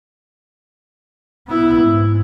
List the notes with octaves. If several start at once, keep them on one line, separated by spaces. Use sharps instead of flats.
B3 E4
G#2